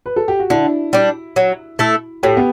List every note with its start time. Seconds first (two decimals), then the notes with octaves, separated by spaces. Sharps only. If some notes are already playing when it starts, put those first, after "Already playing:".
0.06 B4
0.16 A4
0.28 G4
0.40 F#4
0.50 D3 E4
0.93 G3 D4
1.36 F#3
1.79 A3 E4 A4
2.23 A2 G4
2.37 B3